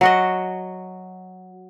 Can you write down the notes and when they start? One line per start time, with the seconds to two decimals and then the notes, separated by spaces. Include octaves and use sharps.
0.01 F#3 F#4 D#5